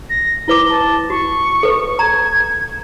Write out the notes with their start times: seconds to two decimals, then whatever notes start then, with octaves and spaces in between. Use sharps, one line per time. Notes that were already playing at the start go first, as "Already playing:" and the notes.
0.09 A#6
0.48 E4 B4 D6 G7
0.69 A5
1.10 F#4 C#6
1.63 A4 B4
1.99 A#5 G#6